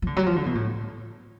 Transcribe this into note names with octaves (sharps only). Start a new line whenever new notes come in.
F3
D3
F#3
F3
D3
B2
A2